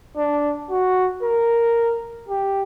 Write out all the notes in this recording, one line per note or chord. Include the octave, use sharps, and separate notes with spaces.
D4
F#4
A#4
G4